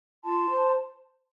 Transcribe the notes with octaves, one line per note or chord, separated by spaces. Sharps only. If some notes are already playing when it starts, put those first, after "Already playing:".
F4 A5 C6
C5